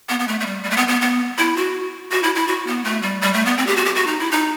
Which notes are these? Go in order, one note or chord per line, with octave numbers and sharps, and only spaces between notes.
B3
B3
A3
A3
G3
G3
A3
B3
B3
B3
E4
F#4
F#4
E4
E4
F#4
B3
A3
G3
G3
A3
B3
C4
G4
F#4
G4
F#4
D#4
E4
D#4